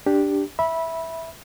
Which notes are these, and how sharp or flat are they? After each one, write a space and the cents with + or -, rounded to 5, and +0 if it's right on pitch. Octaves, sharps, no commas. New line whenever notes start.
D4 +0 G4 +0
E5 -5 B5 -15